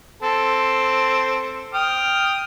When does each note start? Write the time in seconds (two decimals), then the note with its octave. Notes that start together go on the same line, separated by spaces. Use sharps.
0.23 C4 A4
1.74 G5 D#6 F6